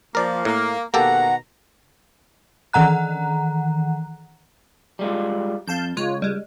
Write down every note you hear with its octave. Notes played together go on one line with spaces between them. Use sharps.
F3 A#3 A#4 D5
A2 A#3
B2 D#3 A#3 G4 A4 F#5 A#5
D#3 E3 F#5 A#5 F#6
G3 G#3 F4
F2 F5 A5 G6
C#2 G#3 F4 C#5
G3 G#3